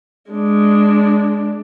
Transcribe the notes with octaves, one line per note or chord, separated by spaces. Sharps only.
G#3 D4